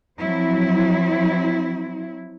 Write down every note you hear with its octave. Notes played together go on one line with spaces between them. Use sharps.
F3 F#3 C4 E4